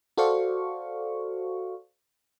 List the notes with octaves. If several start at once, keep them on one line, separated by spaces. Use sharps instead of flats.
F#4 A4 C5 D5 F5 C#6